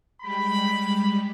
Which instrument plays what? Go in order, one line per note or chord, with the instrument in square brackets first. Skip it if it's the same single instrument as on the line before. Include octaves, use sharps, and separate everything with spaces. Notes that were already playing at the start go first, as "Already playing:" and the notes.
[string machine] G3 G#3 G4 [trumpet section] B5